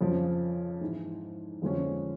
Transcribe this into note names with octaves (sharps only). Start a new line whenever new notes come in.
F2 C#3 F3
G#2 E3 G#3
F2 D3 F3 G#3 C#4